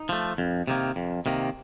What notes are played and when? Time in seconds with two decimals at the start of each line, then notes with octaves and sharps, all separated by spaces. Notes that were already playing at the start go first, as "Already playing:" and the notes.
Already playing: D#4
0.09 F3 A3
0.38 F2
0.67 C3 D#3 A#3
0.96 F2
1.26 C3 D#3 A#3